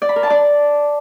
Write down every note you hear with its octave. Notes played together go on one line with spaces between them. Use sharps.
D5
B5
A#4
A5
D5